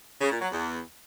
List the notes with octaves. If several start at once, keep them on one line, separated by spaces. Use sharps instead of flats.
C#3
A#2
F#3
E2